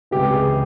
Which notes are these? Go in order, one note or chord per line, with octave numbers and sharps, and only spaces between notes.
C#2 C3 E3 G4
G#4